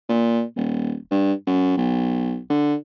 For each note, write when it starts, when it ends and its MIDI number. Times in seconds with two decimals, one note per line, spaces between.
0.09 0.43 46
0.56 0.95 27
1.11 1.33 43
1.47 1.76 42
1.77 2.38 35
2.50 2.75 50